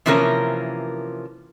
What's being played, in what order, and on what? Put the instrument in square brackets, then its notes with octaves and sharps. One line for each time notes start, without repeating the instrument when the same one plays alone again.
[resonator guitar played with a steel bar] C3 E3 F3 A#3 C#4 A#4